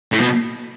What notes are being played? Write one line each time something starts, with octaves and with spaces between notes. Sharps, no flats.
A2
B2